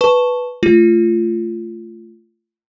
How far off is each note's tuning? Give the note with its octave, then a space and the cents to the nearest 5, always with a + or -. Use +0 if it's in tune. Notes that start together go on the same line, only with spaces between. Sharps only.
B4 +0 A5 +0 C#6 +0
A3 +0 F4 -20